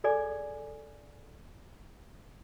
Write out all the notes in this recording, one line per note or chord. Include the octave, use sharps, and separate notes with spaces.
G#4 A4 D5 G#5 D6